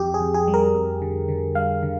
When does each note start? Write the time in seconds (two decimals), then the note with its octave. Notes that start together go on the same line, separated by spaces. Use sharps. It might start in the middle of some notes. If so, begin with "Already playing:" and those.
Already playing: F2 G4
0.14 G#4
0.20 F2
0.34 G#4
0.48 G3
0.54 A#4
0.74 F2
1.02 D3
1.28 D3
1.55 G3 F5
1.83 D3